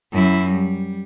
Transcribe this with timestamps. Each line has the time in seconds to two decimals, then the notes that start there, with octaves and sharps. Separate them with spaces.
0.12 F#2 E4
0.51 G3